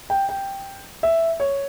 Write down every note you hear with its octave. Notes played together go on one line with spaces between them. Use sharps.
G5
G5
E5
C#5